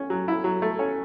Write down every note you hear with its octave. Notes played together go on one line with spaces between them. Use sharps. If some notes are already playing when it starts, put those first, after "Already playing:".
Already playing: C#4
F#3
E4
F#3
A3
C#4